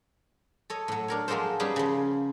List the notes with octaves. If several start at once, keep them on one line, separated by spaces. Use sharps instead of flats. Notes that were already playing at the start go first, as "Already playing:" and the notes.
A4 C#5 D#5
A2 F#3
D4 A#4 C#5
F3 F#3 G#3 A#3 A4 C5
G3 B3 C#4 D#4 G#4
C#3 F3